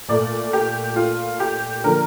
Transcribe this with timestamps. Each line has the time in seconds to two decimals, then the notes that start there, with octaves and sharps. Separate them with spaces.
0.08 A#2 A3 D5
0.53 G4
0.96 F4
1.40 G4
1.84 D3 F3 A#3 A#4